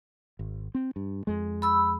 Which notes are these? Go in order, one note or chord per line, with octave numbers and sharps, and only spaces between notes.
G#1
C4
G2
F2 G#3
B5 E6